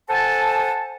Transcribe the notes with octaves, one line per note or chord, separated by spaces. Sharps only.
A4 C5 F#5 G#5 A5